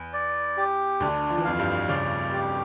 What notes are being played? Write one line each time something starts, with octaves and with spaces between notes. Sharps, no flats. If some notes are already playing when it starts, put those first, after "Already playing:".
Already playing: E2
D5
G4
D2 D3 D4
F3
E3
F2 F3 F5
G2 G3
C#3 C#4 D5
G4